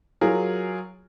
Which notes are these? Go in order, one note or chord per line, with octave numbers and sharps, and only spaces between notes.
F#3 F4 G#4 A#4